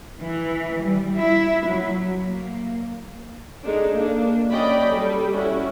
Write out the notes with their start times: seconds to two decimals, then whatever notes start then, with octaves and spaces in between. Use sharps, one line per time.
0.20 E3
0.80 G3
1.18 E4
1.67 F#3
2.21 A#3
3.63 G#3 D4 D#4 A4
3.96 A#3 D4
4.49 F#3 C#4 D5 D#5 G5 B5
4.91 G3 A4
5.33 C#4 E4 F#4